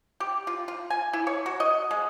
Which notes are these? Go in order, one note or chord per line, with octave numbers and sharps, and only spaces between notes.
G4
F4
F4
G#5
E4
C#5
F#4
D#5
G#3